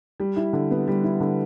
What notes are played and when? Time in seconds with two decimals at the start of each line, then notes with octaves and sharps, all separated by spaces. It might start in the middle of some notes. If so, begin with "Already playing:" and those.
0.20 G3
0.36 E4
0.53 D3
0.71 B3
0.88 G3
1.04 E4
1.20 D3